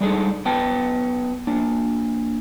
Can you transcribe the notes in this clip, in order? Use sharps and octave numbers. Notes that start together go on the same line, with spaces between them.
G3 G#3 D4 D#4 G#4 A4
F#2 B3 G5 A5
A#3 D4